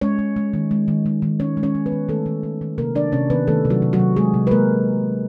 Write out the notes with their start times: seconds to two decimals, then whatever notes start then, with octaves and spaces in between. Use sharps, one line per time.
0.01 G#3 C#4 C#5
0.19 G#3
0.36 G#3
0.53 D#3
0.71 G#3
0.88 D#3
1.06 G#3
1.22 D#3
1.40 G#3 C#4 C#5
1.57 G#3
1.63 C#4 C#5
1.75 G#3
1.86 B3 B4
1.92 D#3
2.09 D#3 A3 A4
2.26 D#3
2.43 D#3
2.61 D#3
2.78 C3 A#3 A#4
2.95 D#3 D4 D5
3.12 C3 C#4 C#5
3.30 D#3 B3 B4
3.47 D#3 A3 A4
3.65 C3
3.70 F#3 F#4
3.82 C3
3.93 F#3 F#4
4.00 C3
4.16 G#3 G#4
4.34 C3
4.47 B4
4.51 G#3 A#3 A#4